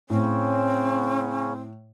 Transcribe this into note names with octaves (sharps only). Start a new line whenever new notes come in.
A2 C#3 C4 C#4